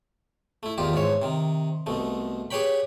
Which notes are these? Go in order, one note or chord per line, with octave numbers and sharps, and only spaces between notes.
A3 E4
E2 D#3 F4 G4
G#2 E3 C#5
C3 D#3
C2 B2 A3
G4 G#4 B4 C#5 G5 B5